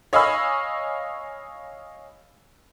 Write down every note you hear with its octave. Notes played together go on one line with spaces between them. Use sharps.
C#5 D#5 F5 G#5 B5 E6